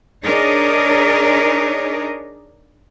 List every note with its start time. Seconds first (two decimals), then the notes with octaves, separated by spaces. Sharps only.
0.24 D4 D#4 G#4 A#4 C#5 D#5